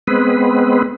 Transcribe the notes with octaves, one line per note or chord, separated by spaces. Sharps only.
G#3 B3 C4 B4